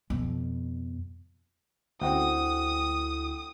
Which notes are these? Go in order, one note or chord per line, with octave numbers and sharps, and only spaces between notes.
F2 B2
D2 C4 E4 F#4 A4 G5 D#6